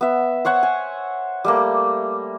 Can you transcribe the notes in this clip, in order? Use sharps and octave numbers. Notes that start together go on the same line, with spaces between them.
B3 E5
C5 C#5 F#5 C#6
G#5
G3 A3 A#3